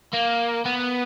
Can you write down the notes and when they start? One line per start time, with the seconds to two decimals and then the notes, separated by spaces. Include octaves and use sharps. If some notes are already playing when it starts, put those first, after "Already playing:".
0.13 A#3
0.65 B3